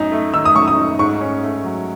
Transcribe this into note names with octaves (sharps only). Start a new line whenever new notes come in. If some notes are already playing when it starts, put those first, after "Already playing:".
Already playing: F#2 D#4
A3
D#3 E6
D#6
F#2 C#6
D#6
D#4
G#2 C#6
C#4
A3
F#3